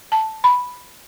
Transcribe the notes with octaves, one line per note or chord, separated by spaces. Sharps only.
A5
B5